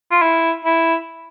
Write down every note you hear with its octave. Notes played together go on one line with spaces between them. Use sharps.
F4
E4
E4